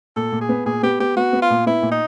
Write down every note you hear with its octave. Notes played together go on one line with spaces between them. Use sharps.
A#2 A4
A#2
G#4
B3
A#2 G#4
B3 G4
B3 G4
B3 F#4
B3
F4
A#2
B3 E4
A#2
D#4